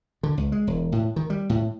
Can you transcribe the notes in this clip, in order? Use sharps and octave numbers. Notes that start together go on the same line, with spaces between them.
D3
C#2
G#3
E1
A2
D#3
G3
A2